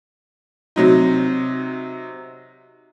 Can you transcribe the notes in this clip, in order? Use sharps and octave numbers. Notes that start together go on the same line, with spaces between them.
C3 F#3 D#4